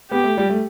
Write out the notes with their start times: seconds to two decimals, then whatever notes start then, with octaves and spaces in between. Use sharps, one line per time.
0.11 B3 G4
0.24 A3
0.37 G3
0.50 A3